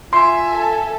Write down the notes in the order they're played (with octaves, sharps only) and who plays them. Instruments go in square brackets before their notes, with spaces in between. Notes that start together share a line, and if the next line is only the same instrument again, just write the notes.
[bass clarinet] F4 [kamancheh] E5 G#5 [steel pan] C6
[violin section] A4